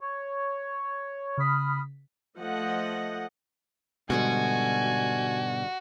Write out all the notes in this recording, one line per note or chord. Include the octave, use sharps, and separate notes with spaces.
C#5
C#3 B5 D#6 F6 B6
F3 A3 D#5 F#5
G#2 B2 D3 G3 F#4 G#5